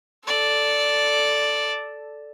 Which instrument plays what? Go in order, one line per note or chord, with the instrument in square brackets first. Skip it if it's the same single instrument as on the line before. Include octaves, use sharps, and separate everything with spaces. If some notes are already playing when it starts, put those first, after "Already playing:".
[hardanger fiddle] A4 D5